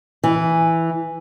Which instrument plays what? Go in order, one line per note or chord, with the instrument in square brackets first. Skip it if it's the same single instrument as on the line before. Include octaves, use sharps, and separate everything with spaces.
[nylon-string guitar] E3